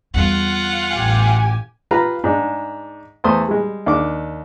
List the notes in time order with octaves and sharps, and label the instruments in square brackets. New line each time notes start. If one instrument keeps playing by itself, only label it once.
[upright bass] E2 G3 [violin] F4 F#5
[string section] A1 G4 G#5
[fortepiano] F4 G4 B4 F5 A#5
G#2 D4
E2 A3 C5 C6 D#6
G3 G#3
D#2 D4 D6